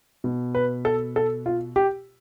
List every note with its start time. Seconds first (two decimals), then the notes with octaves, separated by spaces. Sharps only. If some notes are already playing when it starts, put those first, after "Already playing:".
0.24 B2
0.55 B4
0.85 A4
1.16 A4
1.46 F4
1.76 G4